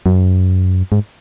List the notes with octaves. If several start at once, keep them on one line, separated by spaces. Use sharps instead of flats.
F#2
G#2